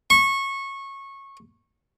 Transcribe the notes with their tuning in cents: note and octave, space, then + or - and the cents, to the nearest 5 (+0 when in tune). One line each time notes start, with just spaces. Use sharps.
C#6 -20